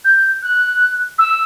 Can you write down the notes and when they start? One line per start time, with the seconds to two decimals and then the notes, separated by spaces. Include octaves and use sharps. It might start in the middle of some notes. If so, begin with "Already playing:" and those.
0.05 G6
0.43 F#6
1.19 E6